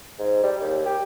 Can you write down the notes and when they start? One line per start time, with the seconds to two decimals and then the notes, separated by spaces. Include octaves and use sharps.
0.19 G#2
0.43 G3
0.61 D#2
0.86 G4